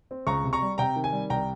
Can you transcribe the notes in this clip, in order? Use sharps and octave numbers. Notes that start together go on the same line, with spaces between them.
C4
C#2 A#5 C#6
C3
A#5 C#6
G3
C3 G5 A#5
D#3
G#5
G3
C2 G5 A#5